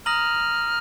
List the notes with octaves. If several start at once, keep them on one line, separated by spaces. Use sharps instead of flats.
A#5 D#6 F6 A#6 D#7 F#7